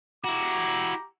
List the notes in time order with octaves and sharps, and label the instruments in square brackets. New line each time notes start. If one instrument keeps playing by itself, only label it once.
[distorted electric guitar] E4 F#4 [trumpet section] G4 A#5 D6